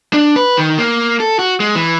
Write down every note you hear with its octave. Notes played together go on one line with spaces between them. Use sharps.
D4
B4
D#3
A#3
A4
F#4
G#3
E3